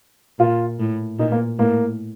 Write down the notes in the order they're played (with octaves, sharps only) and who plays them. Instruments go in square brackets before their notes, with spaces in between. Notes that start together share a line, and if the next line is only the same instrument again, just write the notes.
[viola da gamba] A#2 [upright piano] F4
[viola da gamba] A2
[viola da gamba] A#2 [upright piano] D#4
[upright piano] A#3
[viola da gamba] A2 [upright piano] A#3